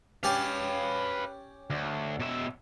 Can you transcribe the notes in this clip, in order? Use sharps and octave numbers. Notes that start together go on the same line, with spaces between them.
C#4 G4 B4 D5 F5
D2
B2 E5